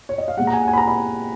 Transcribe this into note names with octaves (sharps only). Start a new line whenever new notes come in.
C#5
D#5
F5
A#2 G#3 F#5
A#5
G#5
F#5
G#5
B5
A#5
B5